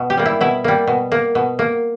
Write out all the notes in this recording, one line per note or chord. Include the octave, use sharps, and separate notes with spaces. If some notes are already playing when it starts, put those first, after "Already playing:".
Already playing: B2
G4
G3 A#3
E4
B2 E4
G3 A#3
B2
A#3
B2
A#3